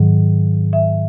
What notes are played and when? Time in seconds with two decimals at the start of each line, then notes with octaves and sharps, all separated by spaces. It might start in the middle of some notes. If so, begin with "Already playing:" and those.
Already playing: G#2 D#3 F#3
0.73 E5